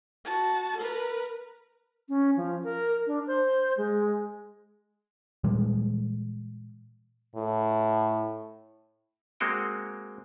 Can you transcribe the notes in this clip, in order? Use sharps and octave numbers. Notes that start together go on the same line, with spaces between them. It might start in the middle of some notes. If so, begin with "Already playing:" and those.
F#4 A5
A#4 B4
C#4
F3
A#4
D4
C5
G#3
A#2 E3 G3 G#3
A2
G#3 A#3 C4 F#4 G5